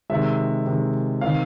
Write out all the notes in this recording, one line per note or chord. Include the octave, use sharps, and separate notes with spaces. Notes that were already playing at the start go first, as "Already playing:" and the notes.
C3 D#3 G#3 E5
C3 D#3 G#3
C3 D#3 F5